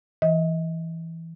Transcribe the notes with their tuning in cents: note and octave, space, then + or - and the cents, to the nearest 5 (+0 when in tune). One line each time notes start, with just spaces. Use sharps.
E3 +0 D#5 +30